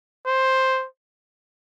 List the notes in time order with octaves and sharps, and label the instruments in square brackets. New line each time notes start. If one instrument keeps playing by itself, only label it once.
[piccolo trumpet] C5